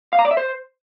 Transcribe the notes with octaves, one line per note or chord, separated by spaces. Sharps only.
F5
A#5
D5
E5
C5